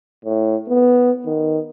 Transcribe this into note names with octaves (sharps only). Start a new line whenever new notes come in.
A2
B3
D#3